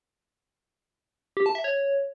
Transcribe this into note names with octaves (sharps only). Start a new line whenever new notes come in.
G4
A5
E5
C#5